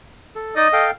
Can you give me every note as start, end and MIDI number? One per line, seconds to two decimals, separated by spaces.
0.35 0.55 69
0.56 0.68 63
0.56 0.68 74
0.56 0.86 75
0.56 0.68 87
0.73 0.91 69
0.73 0.91 77
0.73 0.91 79